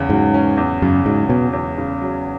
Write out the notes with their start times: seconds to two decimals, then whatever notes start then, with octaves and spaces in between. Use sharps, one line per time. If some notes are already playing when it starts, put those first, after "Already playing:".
Already playing: E2 C#3
0.10 G#2 F#3
0.34 C#4
0.57 E2
0.82 F#2 C#3
1.06 G#2 F#3
1.29 B2 C#4
1.53 E2
1.78 C#3
2.01 F#3